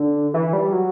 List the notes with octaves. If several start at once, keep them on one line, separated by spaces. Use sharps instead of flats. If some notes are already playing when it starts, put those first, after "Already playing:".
Already playing: D3
E3
G3
F#3